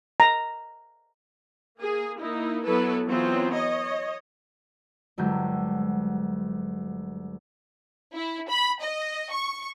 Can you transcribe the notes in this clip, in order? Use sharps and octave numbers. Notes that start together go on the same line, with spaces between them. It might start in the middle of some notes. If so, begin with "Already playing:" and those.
A#5
A#3 G#4
A#3 D#4 E4
F#3 B3 E4 A4 B4
E3 F#3 B3 C4 F4
C#5 D#5
G1 D2 F#3 G#3 G6
E4
B5
D#5
C#6